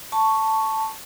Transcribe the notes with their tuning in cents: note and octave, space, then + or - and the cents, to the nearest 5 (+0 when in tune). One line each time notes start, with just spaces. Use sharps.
A5 +0 C#6 +0